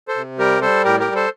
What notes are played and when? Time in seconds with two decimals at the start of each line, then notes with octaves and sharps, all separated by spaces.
0.08 A4 C5
0.16 C3
0.38 G3 G4 A#4
0.61 G3 A4 C5
0.84 A2 G4 A#4
1.00 G4 A#4
1.07 G3
1.15 A4 C5